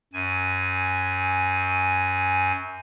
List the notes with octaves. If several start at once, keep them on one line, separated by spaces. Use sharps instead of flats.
F#2 G#5